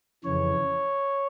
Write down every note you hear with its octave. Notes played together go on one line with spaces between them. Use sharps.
F2 C#3 E3 C#5